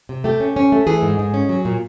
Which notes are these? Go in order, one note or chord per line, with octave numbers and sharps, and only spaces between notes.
C3
A3 G4
C#4
C#4
A3
E3 G#4
G#2
G#2
C#4
F#3
A#2